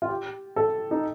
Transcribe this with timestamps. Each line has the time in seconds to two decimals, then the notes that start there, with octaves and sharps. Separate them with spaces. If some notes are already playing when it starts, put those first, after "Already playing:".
0.02 F4
0.09 G4
0.56 A4
0.91 D#4